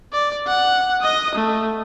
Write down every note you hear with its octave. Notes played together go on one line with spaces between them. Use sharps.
D5
F#5
D#5 D#6
A3